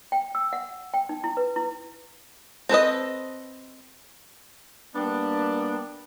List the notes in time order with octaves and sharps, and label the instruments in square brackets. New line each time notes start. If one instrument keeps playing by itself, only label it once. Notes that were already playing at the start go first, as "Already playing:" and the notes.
[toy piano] G5
E6
F#5
G5
D#4
E4
B4
E4
[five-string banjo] C4 A4 B4 D#5
[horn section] G3 A#3 B3 D4